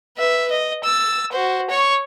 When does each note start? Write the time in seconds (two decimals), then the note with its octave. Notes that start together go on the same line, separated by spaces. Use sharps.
0.17 B4 E5
0.51 D#5
0.84 E6 A6
1.32 F#4 C5
1.70 C#5 C#6